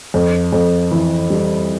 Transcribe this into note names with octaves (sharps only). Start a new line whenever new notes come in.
F2
F2
E3
G3